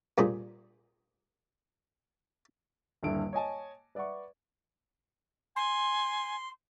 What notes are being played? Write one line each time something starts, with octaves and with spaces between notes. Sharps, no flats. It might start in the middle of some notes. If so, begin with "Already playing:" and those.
G2 A#2 G#4 C5
D#1 G2 D3 E4 D7
C#5 D#5 G#5 A5
B4 D5 E5 F#5 C#6
G#5 C6